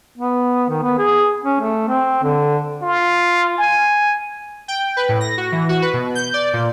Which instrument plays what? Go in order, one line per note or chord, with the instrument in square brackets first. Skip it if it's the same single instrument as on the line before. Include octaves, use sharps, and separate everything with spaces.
[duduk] B3
D#3
B3
G#4
C#4
A3
C4
D3
[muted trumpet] F4
G#5
[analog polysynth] G5
B4
A2
A#6
F#4
E3
F#4
B4
B2
G6
D5
A#2